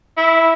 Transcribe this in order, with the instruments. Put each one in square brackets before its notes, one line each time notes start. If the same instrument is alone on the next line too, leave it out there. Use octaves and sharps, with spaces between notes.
[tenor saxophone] E4